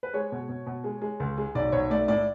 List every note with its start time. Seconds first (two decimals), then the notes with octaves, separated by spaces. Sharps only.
0.03 B4
0.14 G#3 C#5
0.32 B2
0.49 B2
0.66 B2
0.84 G#3
1.02 G#3
1.20 C#2
1.38 G#3
1.55 B1 D5
1.72 B1 C#5
1.90 A3 D5
2.08 A2 D5